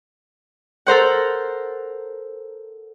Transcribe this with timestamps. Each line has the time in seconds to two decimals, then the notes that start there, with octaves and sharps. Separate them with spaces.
0.87 A4 A#4 C5 F#5